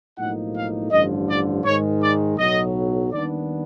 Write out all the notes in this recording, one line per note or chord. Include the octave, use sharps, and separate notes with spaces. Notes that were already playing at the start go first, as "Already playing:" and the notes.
B1 A2 F3 A#3 D#4 F#5
F5
A1 G2 D3 F3 D#5
D5
G#2 D#3 G#3 C#5
D5
B1 A2 F#3 D#5
D#2 D#3 G3 B3 D4 D5